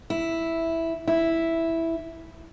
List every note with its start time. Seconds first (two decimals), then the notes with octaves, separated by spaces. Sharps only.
0.10 E4
1.08 E4